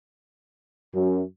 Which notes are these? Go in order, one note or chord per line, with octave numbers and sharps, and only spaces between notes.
F#2